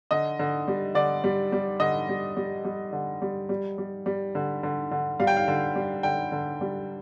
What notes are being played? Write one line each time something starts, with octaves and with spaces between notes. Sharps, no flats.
D3 D#5
D3
G3
D3 D5
G3
G3
D3 D#5
G3
G3
G3
D3
G3
G3
G3
G3
D3
D3
D3
G3 F5
G5
F5
D3
G3
D3 G5
D3
G3